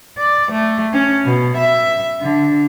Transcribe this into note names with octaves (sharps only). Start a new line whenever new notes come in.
D5
A3
C#4
B2
E5
D3